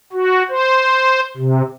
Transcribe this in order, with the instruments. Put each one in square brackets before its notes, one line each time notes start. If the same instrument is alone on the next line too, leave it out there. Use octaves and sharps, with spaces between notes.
[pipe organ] F#4
C5
C3